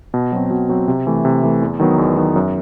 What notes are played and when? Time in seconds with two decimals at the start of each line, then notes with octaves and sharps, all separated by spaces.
0.14 B2
0.32 F#3 C4
0.51 B2
0.69 F#3 C4
0.88 C3
1.07 E3 A3
1.25 C3
1.43 E3 A3
1.62 E2
1.79 D#3 F#3 B3 D#4
1.98 E2
2.17 D#3 F#3 B3 D#4
2.36 F#2